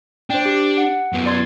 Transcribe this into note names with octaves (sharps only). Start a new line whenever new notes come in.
D4 C5 G5
G4
F#5
F#2 B3
D5 C6 G#6